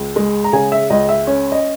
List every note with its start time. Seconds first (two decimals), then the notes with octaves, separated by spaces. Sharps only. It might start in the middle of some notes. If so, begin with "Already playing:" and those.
Already playing: C#2
0.16 G#3
0.44 A#5
0.53 C#3 G#5
0.72 E5
0.90 C#2 D#5
1.09 E5
1.27 C#4
1.52 D#5